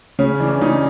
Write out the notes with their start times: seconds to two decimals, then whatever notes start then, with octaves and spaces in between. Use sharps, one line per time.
0.19 C#3 C#4
0.40 E3 D4
0.61 C#3 D#4